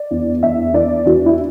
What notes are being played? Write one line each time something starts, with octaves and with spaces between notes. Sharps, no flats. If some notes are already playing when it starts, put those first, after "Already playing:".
Already playing: D5
E2
E2 E5
E3 D5
E3 F#4
E4